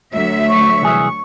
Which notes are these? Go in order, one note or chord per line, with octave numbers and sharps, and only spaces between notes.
D2 F#3 E5
C#6
C2 E3 G#4